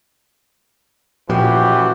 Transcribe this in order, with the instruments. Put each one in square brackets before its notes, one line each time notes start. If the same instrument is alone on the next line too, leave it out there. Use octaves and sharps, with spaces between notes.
[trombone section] A1 E3 F#4 [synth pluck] A#2 [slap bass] F3 [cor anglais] G4